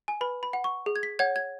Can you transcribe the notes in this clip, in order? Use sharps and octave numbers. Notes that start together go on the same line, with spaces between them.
G#5
B4 B5
B5
F#5
C#6
G#4
G#6
B6
C#5 F#5 G#6
G#6